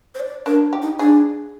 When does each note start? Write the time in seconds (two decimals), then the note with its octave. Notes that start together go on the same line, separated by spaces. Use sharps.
0.15 C5
0.20 D5
0.46 D4 A#4
0.73 G4
0.82 D#4
0.99 D4 G#4